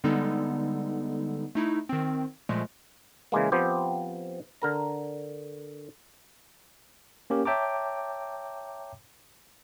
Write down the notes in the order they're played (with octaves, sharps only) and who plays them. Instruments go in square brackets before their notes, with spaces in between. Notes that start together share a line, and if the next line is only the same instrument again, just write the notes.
[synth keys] D3 G3 G#3 B3 D#4 A4
A3 D#4 E4
D#3 C4
A#2 F3 G#3 A3
[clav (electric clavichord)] C#3 E3 G#3 A#3
F3 B3 C4 G4
D3 A#4 A#5
[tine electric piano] A#3 C#4 G4 A#4
C#5 E5 G5 A5 A#5 D6